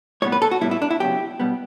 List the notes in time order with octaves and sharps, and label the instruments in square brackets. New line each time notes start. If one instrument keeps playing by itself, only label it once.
[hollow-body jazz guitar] A2 G3 B3 C#5
B4
A4
F#4
A2 G3 B3 E4
E4
D4
E4
C#3 F#3 B3 G4
B2 G3 B3